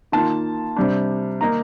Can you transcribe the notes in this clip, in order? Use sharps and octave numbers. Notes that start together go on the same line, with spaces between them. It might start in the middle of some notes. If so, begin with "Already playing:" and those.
D#3 A#3 F4 A5
C3 G3 D4
D#3 A#3 D#4 A#5